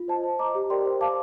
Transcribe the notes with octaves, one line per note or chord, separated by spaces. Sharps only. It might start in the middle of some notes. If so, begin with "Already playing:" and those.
Already playing: F4
C5 D#5 A5
C5
D#5 A#5 D6
G4
A#4 D5 G5 C6
C5
F5 A5 D6